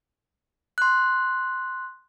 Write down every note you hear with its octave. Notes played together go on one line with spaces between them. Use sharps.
C6 F#6